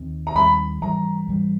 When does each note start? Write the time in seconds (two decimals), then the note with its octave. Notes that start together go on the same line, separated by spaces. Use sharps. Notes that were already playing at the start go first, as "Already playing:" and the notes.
Already playing: D#2 D#3 C4
0.27 A#5
0.35 D#2 D#3 G3 C4 B5
0.82 G#2 E3 G3 A#5
1.28 G#2 E3 G3